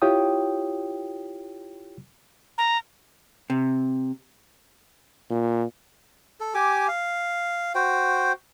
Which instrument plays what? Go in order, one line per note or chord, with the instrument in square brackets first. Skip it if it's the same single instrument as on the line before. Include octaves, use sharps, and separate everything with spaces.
[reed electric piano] E4 F4 G4 C#5 G5 D#6
[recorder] A#5
[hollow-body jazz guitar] C3
[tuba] A#2
[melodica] A4
G4 G#5 D6
F5
F#4 C5 G5